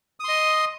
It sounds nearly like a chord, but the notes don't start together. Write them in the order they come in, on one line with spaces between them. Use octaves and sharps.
D#6 C6 D#5